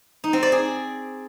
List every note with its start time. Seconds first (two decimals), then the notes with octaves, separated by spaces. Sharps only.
0.24 D#4
0.33 C4
0.43 D5
0.52 G#4